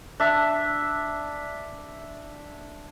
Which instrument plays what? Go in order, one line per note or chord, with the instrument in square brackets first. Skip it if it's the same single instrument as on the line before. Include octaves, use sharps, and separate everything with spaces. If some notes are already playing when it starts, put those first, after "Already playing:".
[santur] D4 E5